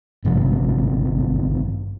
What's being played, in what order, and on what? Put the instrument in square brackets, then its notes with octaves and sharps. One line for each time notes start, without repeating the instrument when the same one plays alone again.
[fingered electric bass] G#1 G2 C3 F3